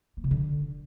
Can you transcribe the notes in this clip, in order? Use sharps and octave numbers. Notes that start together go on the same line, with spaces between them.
A#3
C3
D3